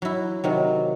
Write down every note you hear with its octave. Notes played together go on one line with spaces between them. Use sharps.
F#3 E4
C3 D#3 F#3